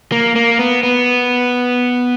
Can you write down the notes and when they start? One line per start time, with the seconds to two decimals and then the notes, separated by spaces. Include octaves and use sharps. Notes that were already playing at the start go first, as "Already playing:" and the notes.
0.12 A#3
0.36 A#3
0.59 B3
0.83 B3